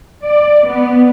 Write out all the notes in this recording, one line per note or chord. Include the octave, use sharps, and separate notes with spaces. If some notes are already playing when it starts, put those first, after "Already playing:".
D5
B3